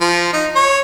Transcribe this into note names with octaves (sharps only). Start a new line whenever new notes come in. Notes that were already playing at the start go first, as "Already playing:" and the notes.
F3
D#4
C#5